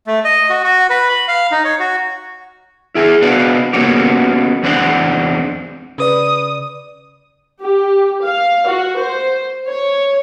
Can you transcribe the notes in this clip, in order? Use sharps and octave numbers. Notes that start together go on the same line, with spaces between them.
A3
D#5
F#4
F#4
B4
B5
F5
D#4
C#5
F#4
E4 G#4 E5
B3 D4 F#4 B4 D5 F5
A#3 B3 C#4 F#4 G4
E2 C4 D4 C5 F#5
C#3 B4 D5 D#6
G4
F5
F#4
C5
C#5